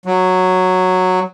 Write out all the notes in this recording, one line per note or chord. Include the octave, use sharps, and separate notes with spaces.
F#3